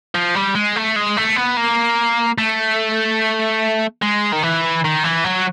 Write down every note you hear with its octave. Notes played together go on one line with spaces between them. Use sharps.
F3
G3
G#3
A3
G#3
A3
B3
A#3
A3
G#3
D#3
E3
D#3
E3
F#3